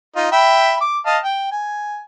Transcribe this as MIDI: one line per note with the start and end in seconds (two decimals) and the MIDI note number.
0.16 0.30 63
0.16 0.30 65
0.32 0.78 76
0.32 0.78 79
0.32 0.78 83
0.81 0.98 86
1.06 1.17 75
1.06 1.17 77
1.06 1.17 81
1.24 1.47 79
1.51 2.00 80